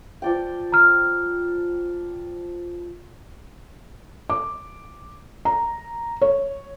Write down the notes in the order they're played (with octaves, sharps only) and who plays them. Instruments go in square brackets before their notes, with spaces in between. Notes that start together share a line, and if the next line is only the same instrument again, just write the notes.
[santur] F3 D5 G5
[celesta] A#5 F6
[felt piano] D6
A#5
C#5